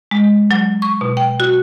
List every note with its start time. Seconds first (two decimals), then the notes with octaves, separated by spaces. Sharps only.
0.11 G#3
0.51 F#3
0.82 C#6
1.01 B2
1.17 G5
1.40 F#4